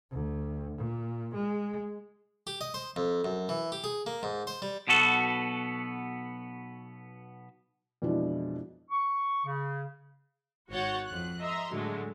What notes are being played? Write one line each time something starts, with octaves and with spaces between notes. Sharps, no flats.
D2
A#2
G#3
G4
D#5
C5
F2
F#2
E3
G4
G#4
A#3
G#2
C5
G3
B1 B2 B3 F#4 A4
F2 B2 E3 G#3 D4 E4
C#6
C#3
G#1 F#4 C#5 F#5 G6 A6
F2 F#6
D#5 E5 A#5 C6
A2 D3 F#3 G#3 A3